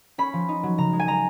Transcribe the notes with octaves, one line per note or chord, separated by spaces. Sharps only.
C#4 B5
F3
D#4
F#3
C#3 A#5
G#3
G#5
G#3 A#5